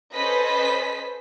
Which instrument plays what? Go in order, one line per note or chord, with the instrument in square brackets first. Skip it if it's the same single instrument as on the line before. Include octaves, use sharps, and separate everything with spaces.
[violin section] C#4 A4 B4 C5 D#5 B6